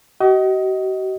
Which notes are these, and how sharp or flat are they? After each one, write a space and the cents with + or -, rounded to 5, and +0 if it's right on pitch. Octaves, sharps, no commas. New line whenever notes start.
F#4 +45 D#5 +20